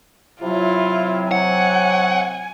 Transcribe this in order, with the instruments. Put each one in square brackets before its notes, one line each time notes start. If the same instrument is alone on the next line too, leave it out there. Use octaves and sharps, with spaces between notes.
[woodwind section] C3 F#3 [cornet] E4 [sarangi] F4
[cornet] C#5 [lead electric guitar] F#5 [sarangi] G#5